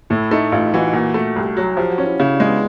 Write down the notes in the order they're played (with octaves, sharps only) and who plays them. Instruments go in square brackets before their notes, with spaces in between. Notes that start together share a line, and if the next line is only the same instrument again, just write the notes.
[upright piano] A2 [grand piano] E4
[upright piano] A3 [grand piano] D#4
[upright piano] A1 [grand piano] F4
[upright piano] E3 [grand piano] F#4
[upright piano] A#2 [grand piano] F#4
[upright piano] A3
C2
F#3
[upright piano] F3 [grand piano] G4
[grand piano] F#4
[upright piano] C#4
[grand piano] E4
[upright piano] C#3 [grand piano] E4
[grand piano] D4
[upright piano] G#3
[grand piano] B3